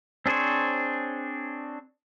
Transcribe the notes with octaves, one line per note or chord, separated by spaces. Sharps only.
C4 D4 G#4 C5 C#5